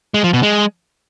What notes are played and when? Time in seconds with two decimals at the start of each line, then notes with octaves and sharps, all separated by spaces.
0.14 G#3
0.24 F3
0.33 B2
0.43 G#3